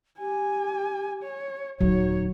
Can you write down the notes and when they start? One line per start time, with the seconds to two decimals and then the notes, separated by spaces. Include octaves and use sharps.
0.19 G4 G#5
1.23 C#5
1.81 D#1 D2 F#3 D#4 C#5